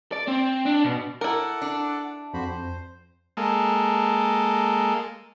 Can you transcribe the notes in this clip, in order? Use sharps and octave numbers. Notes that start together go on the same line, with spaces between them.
D5
C4
D4
B2
E4 A4 A#4 F#5 D6
D4
F2 F#4 C5 B5
C5
G#3 A#3 A4